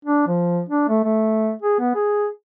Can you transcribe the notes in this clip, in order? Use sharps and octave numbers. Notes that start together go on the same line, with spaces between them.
D4
F3
D4
A3
A3
G#4
B3
G#4